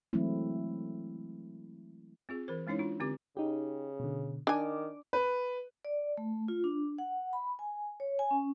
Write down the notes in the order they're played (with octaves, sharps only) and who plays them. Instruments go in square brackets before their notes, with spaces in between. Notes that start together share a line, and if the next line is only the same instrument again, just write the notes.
[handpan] E3 F#3 G#3 A3 C4 E4
[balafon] C4 F4 G#4
E3 A#4 C5
G#3 C#4 D#4 E4 C#5
D4 F4
D3 C4 G4 D6
[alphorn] C#3 [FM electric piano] D#4 G4
[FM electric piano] B2 D3
[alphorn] D#3 [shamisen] D4 G#5 [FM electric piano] D6
[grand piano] B4
[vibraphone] D5
A3
F4
D4
F#5
B5
G#5
C#5
G#5
C#4